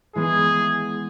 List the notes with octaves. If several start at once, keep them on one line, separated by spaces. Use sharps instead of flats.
E3 G#3 B3 G#4